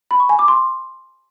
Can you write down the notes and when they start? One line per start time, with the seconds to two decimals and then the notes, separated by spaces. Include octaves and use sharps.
0.11 B5
0.20 C#6
0.29 G#5
0.39 D6
0.48 C6